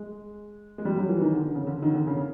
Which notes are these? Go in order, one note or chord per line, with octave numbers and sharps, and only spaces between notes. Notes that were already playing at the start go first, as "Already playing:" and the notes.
Already playing: G#3
G#3
G3
F#3
E3
D#3
D3
C#3
D3
D#3
D3
C#3